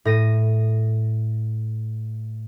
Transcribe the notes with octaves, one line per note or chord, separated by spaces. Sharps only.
A2 A#6 D#7